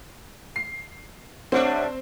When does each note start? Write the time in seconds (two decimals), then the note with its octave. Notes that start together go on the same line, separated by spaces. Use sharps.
0.56 C7
1.52 G3 A3 C4 D4 C5 C#5 F#5